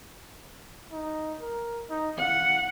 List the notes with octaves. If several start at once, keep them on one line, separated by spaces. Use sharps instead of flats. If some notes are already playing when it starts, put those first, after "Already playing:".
D#4
A#4
D#4
F5 F#5